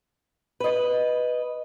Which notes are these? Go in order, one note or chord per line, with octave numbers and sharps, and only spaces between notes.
B4 D#5